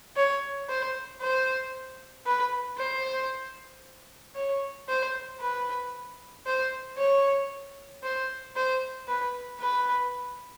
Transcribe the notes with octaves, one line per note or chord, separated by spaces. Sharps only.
C#5
C5
C5
B4
C5
C#5
C5
B4
C5
C#5
C5
C5
B4
B4